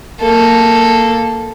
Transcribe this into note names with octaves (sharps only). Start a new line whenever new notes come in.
A#3 A4